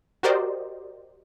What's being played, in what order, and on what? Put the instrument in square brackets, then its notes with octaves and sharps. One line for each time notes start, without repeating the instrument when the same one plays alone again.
[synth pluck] F#4 G4 A#4 C5 D5 D#5